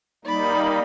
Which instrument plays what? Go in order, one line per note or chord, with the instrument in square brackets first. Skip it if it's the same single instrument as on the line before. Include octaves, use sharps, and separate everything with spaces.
[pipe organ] G3 A#3 D#4 [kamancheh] D5 B5